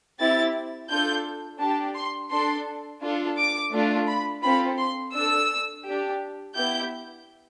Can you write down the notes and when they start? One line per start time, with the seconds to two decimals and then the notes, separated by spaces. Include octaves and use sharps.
0.19 C4 E4 G4 A6
0.89 D4 F4 A4 G6
1.61 D4 G4 A5
1.96 C6
2.31 D4 A4 C6
3.02 D4 F4 A4
3.37 D6
3.73 A3 D4 F4
4.08 B5
4.43 C4 F4 A4 B5
4.79 C6
5.14 D4 A4 E6
5.85 G4
5.90 D4
6.55 B3 E4 G4 G6